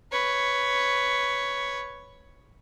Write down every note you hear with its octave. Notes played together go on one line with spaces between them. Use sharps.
B4 C#5